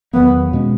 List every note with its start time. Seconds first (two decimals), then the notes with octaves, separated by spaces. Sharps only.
0.13 E2 D#3 F#3 A#3 B3
0.53 B2 G#3 C#4